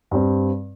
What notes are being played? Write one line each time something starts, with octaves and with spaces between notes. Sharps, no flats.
G2 G3 C4